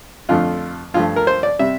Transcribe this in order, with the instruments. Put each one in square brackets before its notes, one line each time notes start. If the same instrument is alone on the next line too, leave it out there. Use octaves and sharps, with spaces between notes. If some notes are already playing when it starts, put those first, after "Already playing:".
[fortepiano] F2 D3 F3 A3 F4
G2 F3 A3 F4
A#4
C5
D5
C3 G3 E5